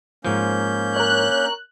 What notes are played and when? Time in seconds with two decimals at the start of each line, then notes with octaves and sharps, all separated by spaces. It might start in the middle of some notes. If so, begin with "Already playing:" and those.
0.25 G#2 F3 A#3 C#4 G6
0.96 A#4 C#5 F#6